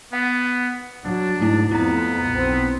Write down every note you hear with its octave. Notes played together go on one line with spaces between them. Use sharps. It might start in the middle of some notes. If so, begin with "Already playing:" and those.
B3 F#5
F#3 D4
G#2 A3 E4
F2 B3 E4 A#5
B1 C4